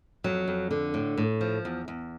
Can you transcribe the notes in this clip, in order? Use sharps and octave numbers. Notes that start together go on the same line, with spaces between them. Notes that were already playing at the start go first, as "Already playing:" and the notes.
F2 F#3
F2
D3
A2
A2
F3
E2
E2